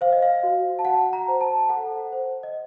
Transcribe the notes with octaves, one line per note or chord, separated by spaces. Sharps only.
C5 F5
D#5
F5
F#4
A5
F#4 F#5
A#5
C5
A5
A4 F#5
C5
D#5